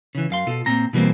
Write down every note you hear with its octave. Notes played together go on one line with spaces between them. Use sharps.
C#3 E3
F#2 F5 C6
B2 F4 A4
A#2 C4 A#5
B2 E3 G3 A#3 C4